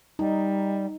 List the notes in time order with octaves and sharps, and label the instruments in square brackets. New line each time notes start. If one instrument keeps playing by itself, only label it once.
[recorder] G3 [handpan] D#4